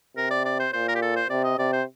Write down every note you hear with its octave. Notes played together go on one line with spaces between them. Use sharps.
C3 A#4
D5
D5
C5
A#2 C5
A#4
G4
A4
C5
C3 D5
D#5
C3 D5
C5